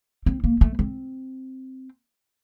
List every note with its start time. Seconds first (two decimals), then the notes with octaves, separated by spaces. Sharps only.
0.26 C4
0.44 A#3
0.61 A3
0.79 C4